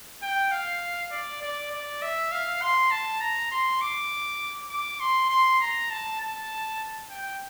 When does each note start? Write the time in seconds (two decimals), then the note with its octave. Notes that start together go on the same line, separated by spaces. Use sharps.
0.22 G5
0.52 F5
1.11 D5
1.42 D5
1.72 D5
2.02 E5
2.32 F5
2.62 C6
2.91 A5
3.21 A#5
3.52 C6
3.81 D6
4.70 D6
5.00 C6
5.30 C6
5.61 A#5
5.90 A5
6.21 A5
7.10 G5